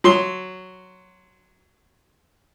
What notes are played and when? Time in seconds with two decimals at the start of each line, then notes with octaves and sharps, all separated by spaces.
0.04 F#3 C6